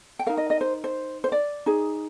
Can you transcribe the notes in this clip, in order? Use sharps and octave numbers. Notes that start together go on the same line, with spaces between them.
G5
D#4 A#4 F5
D#5
D#5
C5
C5
C5
D5
D#4 G#4